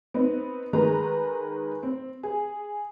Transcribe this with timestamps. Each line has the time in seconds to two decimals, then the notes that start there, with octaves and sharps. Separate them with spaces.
0.14 B3 C4 D#4
0.73 D#3 G#3 B4 A#5
1.83 C4
2.23 G#4